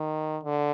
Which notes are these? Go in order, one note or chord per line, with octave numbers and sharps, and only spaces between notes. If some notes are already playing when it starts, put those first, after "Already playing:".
Already playing: D#3
D3